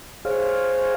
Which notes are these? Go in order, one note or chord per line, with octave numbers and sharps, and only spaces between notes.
G#4 C5 C#5 F5